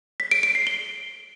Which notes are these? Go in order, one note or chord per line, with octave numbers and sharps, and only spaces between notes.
B6
D7
D7
C7
G7